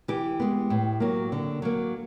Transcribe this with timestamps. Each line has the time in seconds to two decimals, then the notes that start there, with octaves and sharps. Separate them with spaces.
0.08 E3 G4
0.40 G#3 B3
0.70 A2
1.00 F#3 A#3
1.32 D3
1.62 F#3 A#3